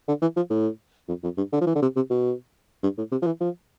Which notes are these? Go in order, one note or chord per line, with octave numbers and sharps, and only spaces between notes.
D3
E3
F3
A2
F2
F2
G2
D3
F3
E3
D3
C3
C3
B2
G2
A2
C3
F3
E3
F3